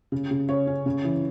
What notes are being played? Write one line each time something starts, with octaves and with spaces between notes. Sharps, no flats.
C#3
C#3
C#3 C#5
C#4
C#3
E3